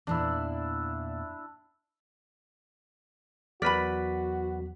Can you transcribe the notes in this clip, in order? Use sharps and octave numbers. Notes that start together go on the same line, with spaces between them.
E2 A#2 D4 E4
E2 F#3 F#4 A#4 B4 D5 B5 B6